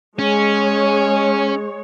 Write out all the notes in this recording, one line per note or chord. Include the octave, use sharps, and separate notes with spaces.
G#3 C#4 C#5